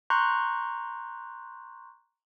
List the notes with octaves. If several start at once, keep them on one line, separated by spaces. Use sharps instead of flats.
A#5 C6 C#6 F#6 G6